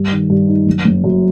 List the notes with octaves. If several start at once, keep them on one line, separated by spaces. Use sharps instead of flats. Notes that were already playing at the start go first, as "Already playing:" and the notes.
Already playing: G2
D#3
G2
D#4
F#1
F#1
F#2